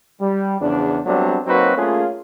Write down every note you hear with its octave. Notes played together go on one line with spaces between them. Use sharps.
G3
E2 C#3 F3 D4
F#3 G3 A3 B3 C4 D4
F#3 A#3 C4 D#4 F#4 B4
A3 A#3 C#4 F4 G#4